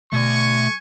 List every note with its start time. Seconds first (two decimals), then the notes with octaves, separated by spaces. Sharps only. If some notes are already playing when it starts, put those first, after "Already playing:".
0.13 B2 A3 D5 G#5 C#6